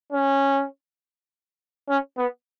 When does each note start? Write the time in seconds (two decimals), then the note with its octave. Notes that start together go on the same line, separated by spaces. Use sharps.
0.12 C#4
1.89 C#4
2.18 B3